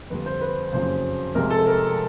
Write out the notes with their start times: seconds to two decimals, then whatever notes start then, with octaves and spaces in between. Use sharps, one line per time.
0.10 F2 D3 G3 B4
0.26 C5
0.41 B4
0.73 F#1 F2 C#3 F#3 C5
1.35 F1 F2 C3 F3 G#3 A#4
1.50 A4
1.67 A#4